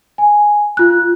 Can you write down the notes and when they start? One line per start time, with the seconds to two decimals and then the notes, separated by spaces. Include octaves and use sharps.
0.18 G#5
0.77 F4 F#6